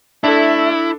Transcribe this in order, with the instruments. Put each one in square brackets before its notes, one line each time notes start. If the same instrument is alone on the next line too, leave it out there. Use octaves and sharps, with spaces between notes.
[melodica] A3 [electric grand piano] D4 A4 [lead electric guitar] E4